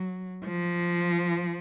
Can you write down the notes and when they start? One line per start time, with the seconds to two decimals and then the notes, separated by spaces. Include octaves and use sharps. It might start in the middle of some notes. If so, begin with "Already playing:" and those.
Already playing: F#3
0.45 F3